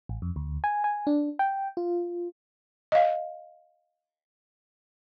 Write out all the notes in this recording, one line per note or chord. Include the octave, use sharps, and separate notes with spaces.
A1
F2
D2
G#5
G#5
D4
G5
F4
D#5 F5